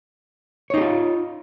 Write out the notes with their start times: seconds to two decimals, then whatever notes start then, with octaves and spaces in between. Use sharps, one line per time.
0.70 C#5
0.74 D#4
0.77 G4
0.81 F4